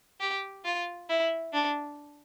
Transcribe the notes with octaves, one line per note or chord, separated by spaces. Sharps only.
G4
F4
E4
D4